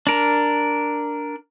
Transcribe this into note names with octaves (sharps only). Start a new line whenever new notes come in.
D4 A#4